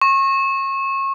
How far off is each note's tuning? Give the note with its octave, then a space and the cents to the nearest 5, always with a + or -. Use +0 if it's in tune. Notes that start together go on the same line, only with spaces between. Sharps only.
C#6 -30